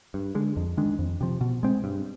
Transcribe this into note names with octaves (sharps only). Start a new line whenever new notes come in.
G2
D3 G#3
F2
D#3 G#3 D4
F2
C3 F3
B2
G#3 C4
G2